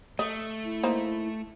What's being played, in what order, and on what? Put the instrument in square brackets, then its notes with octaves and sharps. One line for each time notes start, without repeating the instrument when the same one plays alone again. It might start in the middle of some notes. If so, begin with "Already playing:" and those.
[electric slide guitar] A3 [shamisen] D#5
[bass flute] E4
[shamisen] A#3 D#4 C5